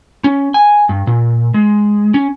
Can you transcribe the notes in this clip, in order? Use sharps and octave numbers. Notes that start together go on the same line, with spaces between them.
C#4
G#5
G2
A#2
G#3
C#4